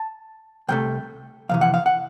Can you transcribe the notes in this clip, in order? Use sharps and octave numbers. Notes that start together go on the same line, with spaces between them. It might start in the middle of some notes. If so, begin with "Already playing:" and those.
Already playing: A5
C2 C3 A3 G5
F2 C3 E3 F5
F#5
F5
F#5